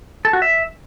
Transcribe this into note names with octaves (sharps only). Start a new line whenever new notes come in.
A4
F#4
E5